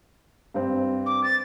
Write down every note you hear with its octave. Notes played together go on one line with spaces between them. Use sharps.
G2 C4
D6
A6